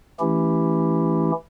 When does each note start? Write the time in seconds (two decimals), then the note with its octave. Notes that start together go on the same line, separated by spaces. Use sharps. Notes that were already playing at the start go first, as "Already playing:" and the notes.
0.20 E3 A3 C#4 E4 G4